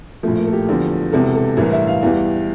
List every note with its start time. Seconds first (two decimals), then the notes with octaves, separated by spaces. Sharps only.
0.23 A#1 A2 F3 A3
0.38 A#3
0.46 A4
0.53 G4
0.69 E2 D3 F3
1.12 E1 E2 C3 A4
1.35 A4
1.57 A1 G2 E3 A#4
1.72 E5
1.87 F5
2.02 E2 E3 G3